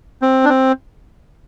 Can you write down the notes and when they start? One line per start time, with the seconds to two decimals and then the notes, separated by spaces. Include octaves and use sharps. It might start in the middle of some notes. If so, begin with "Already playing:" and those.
0.22 C4
0.45 D4
0.49 C4